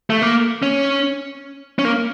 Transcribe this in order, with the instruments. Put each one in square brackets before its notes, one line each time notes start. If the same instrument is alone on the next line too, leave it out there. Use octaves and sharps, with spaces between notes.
[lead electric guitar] A3
A#3
C#4
C#4
A#3